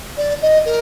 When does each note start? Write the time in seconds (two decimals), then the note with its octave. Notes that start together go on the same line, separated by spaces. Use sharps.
0.17 D5
0.42 D#5
0.65 A#4